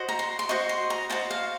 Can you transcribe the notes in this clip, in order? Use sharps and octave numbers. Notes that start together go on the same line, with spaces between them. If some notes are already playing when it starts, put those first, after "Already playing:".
Already playing: F#4 C5 D#5
A#5
C6
C6
F#4 C5 D#5 C#6
C6
A#5
F#4 C5 D#5 A5
F5